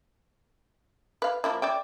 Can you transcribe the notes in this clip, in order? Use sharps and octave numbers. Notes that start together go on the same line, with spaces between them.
B4 F5
F3 A#3 E4
D5 E5 G5